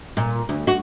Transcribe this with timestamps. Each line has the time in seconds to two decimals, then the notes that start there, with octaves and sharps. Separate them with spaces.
0.17 A#2
0.49 D2
0.67 F#4